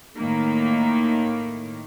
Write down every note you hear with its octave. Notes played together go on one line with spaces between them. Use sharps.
A2 D#3 A#3